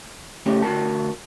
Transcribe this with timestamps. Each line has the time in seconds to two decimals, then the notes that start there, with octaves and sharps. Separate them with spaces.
0.46 C#3 A3 C#4 G4
0.62 D2 F#4 A#4 A5